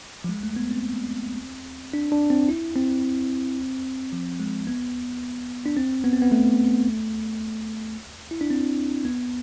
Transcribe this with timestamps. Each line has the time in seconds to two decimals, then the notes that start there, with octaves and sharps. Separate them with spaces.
0.24 F3
0.29 G#3
0.43 A3
0.56 B3
0.71 C4
1.94 D4
2.12 D4
2.30 C4
2.49 E4
2.76 C4
4.12 F3
4.40 G#3
4.67 B3
5.66 D4
5.77 C4
6.04 B3
6.13 C4
6.22 B3
6.32 A3
8.31 E4
8.41 D4
8.50 C4
9.05 B3